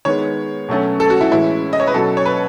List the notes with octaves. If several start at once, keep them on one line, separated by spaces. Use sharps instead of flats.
D#3 G#3 B3 C#5
B2 F#3 A3 C#4
A4
F#4
E4
A2 E3 G#3 C#4 E4
D#5
C#5
B4
B2 F#3 C#4 A4
C#5
B4